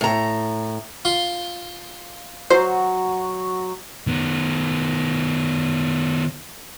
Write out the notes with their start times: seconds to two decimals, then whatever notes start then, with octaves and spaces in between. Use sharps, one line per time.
0.01 A2 A#5
1.05 F4 C6
2.50 F#3 F#4 C5
4.07 D#3 B3